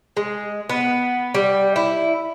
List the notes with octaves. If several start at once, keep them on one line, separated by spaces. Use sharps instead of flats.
G#3
B3
G3
E4